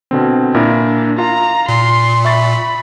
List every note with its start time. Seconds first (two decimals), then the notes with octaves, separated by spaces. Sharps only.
0.11 B2 D3 C4
0.54 A#2 D4 E4 A#4
1.18 F4 F5 A#5
1.69 A#2 C6
2.25 E5 B5 C#6 A6